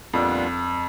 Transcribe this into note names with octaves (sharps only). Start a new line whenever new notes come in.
F2 A#2 G3 B3 D4 F4